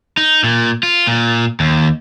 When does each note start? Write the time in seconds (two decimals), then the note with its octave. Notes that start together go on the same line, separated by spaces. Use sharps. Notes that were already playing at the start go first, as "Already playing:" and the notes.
0.17 D#4
0.44 A#2
0.83 F4
1.07 A#2
1.60 D#2